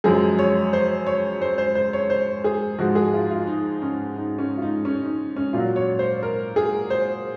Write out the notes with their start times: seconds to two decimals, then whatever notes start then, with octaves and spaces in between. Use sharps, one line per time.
0.04 F#2 F3 G#3 G#4
0.39 C#5
0.73 C5
1.07 C#5
1.41 C5
1.58 C5
1.75 C5
1.93 C#5
2.10 C5
2.44 G#4
2.78 G#2 F3 G#3 F#4
2.95 G#4
3.13 F4
3.30 F4
3.47 D#4
3.82 C#4
4.16 D#4
4.39 C#4
4.57 F4
4.62 D#4
4.85 C#4
5.02 D#4
5.36 C#4
5.53 A#2 F#3 F4
5.76 C#5
5.99 C5
6.23 A#4
6.56 G#4
6.90 C5